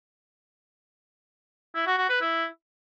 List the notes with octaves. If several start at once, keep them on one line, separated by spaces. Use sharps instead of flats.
E4
F#4
F#4
B4
E4